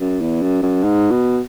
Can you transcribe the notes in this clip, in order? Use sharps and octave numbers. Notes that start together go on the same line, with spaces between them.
F#2
E2
F#2
F#2
G#2
B2